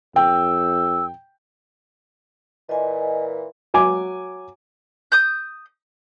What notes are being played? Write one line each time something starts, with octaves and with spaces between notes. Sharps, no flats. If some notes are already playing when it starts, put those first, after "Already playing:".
F2 G5 E6
A#2 E3 D#5 G#5
F#3 G#5 D6
D#6 G6